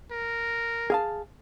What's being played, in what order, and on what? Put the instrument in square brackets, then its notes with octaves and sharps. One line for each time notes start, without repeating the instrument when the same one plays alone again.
[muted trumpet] A#4
[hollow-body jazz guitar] G#4 F5 A5